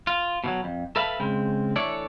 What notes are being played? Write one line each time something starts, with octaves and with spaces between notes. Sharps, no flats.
F4
B2 E3 F#3
F2
A4 B4 E5 F5 A5 B5
C#3 G#3 C4
E3 A3 D4 A4 C#5 D5